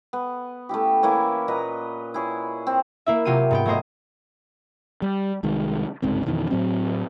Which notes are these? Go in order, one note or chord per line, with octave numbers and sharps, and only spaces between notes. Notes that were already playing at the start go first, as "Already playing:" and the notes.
B3
A3 C#4 E4 G4
E3 A#3 E4 C#5
A#2 B4 D#5 A#5
E4 G#4 C#5
C4
A#3 E4 E5
C3 F#3 F4 G4 D#7
G#2 B3 G5
F#3 A3 A#3 C5 D#5
G3
C2 D#3 G#3
G1 C#2 G#2 C4
F2 B2 D#3 E3
A2 F#3 C4